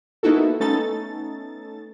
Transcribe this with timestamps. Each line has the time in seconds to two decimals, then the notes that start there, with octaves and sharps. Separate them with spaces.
0.23 A#3 B3 D#4 E4 F#4 A4
0.60 A3 B3 C#4 D#4 A4 A6